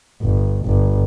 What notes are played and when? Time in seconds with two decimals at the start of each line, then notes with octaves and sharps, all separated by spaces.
0.22 G1
0.66 G1